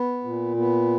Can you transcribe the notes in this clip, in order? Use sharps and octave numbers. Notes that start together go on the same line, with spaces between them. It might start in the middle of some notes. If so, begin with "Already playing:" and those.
Already playing: B3
A#2
B3